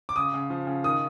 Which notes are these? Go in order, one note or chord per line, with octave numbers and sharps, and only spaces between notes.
D6
C#3 D#6
C#3
F3
C#3
D#3 D#6